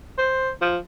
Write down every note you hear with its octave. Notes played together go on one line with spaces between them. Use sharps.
C5
F3